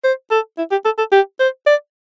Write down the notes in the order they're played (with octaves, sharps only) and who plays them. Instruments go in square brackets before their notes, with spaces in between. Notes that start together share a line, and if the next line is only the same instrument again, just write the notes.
[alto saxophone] C5
A4
E4
G4
A4
A4
G4
C5
D5